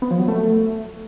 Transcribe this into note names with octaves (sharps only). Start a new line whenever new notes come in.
B3
F3
F#3
A3